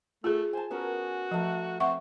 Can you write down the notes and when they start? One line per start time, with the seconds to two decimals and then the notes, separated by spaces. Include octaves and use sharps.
0.24 A3 F4 G#4 A5
0.53 C5 G#5 A5
0.71 B3 C#4 F#4 A#4
1.31 F3 A3 A#5
1.80 C4 E5 F#5 C#6